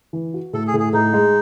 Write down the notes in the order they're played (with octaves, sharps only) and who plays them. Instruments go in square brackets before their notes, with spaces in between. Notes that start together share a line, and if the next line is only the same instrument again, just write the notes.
[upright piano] E3
F#4
[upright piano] A2 [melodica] A4
[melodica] G#4
[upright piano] A2
[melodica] G#4
[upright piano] A2 [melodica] D#4
[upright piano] G#3